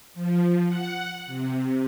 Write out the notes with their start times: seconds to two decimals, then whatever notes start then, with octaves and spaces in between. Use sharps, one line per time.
0.14 F3
0.67 F#5
1.26 C3